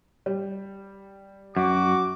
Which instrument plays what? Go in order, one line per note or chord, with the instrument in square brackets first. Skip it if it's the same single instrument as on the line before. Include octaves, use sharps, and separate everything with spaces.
[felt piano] G3
[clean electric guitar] F#2 [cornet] F#4 [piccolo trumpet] D6